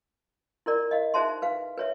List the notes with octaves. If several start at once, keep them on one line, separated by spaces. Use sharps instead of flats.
E4 A#4 D5
D#5 F5
D#4 G#4 C5 E5 A5 C6
B4 F5
B4 C#5 E5